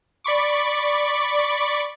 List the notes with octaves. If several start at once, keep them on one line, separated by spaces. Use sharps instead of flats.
D5 B5 C#6 D6